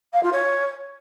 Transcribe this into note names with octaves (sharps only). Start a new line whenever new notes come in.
F5
F4
C#5